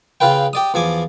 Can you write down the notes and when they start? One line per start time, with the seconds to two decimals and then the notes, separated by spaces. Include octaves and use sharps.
0.20 C#3 F4 B4 G5
0.53 G4 D5 D#6
0.74 E2 F3 G#5 D6